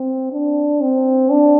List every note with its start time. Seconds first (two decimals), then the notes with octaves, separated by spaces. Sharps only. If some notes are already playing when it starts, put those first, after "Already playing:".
Already playing: C4
0.32 D4
0.81 C4
1.30 D4